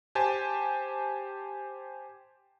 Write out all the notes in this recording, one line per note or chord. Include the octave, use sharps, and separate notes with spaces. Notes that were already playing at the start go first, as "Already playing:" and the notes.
G4 C5 G#5 A5